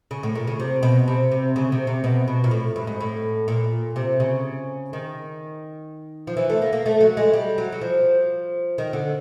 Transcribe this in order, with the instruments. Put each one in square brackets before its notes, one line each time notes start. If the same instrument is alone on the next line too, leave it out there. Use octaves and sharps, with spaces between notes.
[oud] C#3
A2
A#2
C#3
C3
B2
C3
C3
C#3
C3
C3
B2
B2
A#2
A2
G2
G#2
A2
A#2
C3
C#3
D#3
F3
E3
A3
A#3
A#3
A3
F#3
G#3
G3
F#3
F#3
F3
D#3
D3